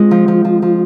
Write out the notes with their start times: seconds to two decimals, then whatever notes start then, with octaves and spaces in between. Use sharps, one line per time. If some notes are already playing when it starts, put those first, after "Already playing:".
Already playing: G#3 C4 F4
0.11 F3
0.28 F3
0.45 F3
0.62 F3